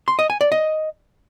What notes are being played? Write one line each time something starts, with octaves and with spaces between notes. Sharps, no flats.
C6
D#5
G#5
D5
D#5